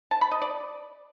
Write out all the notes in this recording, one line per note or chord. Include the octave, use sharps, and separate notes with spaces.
A5
B5
D#5
D5